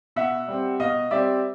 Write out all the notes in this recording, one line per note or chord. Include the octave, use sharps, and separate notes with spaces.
B2 E5 F#5
G3 C4
B2 D#5 F5
G3 C4 D5 E5